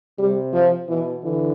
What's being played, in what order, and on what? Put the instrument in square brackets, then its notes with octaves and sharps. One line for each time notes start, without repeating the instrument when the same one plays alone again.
[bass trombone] C3 [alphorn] G3
[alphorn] F3
[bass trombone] B2 [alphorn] E3
[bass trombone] D3 [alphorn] E3